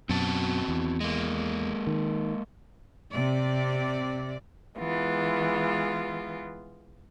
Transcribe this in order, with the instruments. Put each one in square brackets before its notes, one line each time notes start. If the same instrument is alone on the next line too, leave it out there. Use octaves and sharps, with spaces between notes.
[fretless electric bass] F#2 B2 [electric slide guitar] C4 F#4 A5
[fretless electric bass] E2
[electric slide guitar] G#3 A#3
[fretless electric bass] D#3
[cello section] C3 D5
[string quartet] E3 G#3 B3 F4